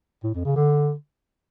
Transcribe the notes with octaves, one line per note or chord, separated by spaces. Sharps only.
A2
F2
C#3
D3